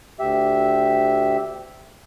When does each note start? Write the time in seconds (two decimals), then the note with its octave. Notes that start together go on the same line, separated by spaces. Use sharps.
0.19 D2 G4 E5